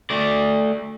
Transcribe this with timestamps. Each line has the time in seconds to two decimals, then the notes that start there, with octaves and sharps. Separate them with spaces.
0.10 A3 D5